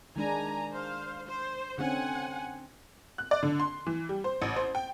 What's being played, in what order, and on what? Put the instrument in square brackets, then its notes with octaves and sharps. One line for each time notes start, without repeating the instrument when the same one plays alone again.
[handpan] D#3 G#3 D4 [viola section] G#5 A#5
[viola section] C5 F5
C5
[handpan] D3 C4 C#4 [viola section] F#5 G#5
[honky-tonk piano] F#6
D5
D3
C6
E3
G3
C5
A1
C5
G5